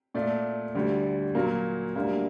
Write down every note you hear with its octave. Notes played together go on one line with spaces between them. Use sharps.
A#2 A3 D5
D2 D3 G3
A#2 F#3 A#3
D2 D3 G3 A#3